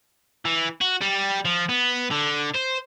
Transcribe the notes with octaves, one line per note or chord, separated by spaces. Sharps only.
E3
F#4
G3
F3
B3
D3
C5